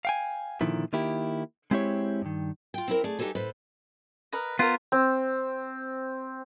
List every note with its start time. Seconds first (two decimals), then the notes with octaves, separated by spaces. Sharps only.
0.05 F5 G5 G#5
0.61 A#2 D3 D#3 F3 E4
0.93 D#3 A#3 E4 G4
1.71 G#3 C4 E4 G4 C#5
2.22 G2 D#3
2.74 F4 G5
2.88 C4 E4 A#4
3.04 A3 G#4 D5
3.19 G2 D#4 G4 A4 C#5 G#5
3.35 A2 A4 B4 C5
4.32 A#4 B4 D#5
4.59 B3 F4 A#4 C5
4.92 C4